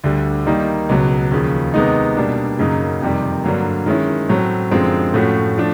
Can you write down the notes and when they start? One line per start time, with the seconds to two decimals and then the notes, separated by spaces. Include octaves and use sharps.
0.04 D2 D3 G3
0.46 D#3 G3 A#3 D#4
0.89 C#2 B2 F#3
1.31 D#2 C#3 F3
1.74 C3 D#3 G#3 B3 D#4
2.17 B2 G3 A#3 D4
2.59 F#2 C#3 F#3 A#3 D#4
3.01 F2 C3 D#3 G3
3.44 G2 D3 F#3 A#3
3.86 D#3 G#3 C#4 E4
4.29 A2 F#3 A3 C4
4.71 F#2 D3 F3 G#3 C4
5.14 A2 F3 A3 C#4 F#4
5.58 F3 A3 D4